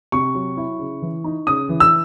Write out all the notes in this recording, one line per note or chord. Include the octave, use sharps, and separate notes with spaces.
C3 C#6
F#3
E4
C#3
E3
D#4
C#3 D#6
E3
E6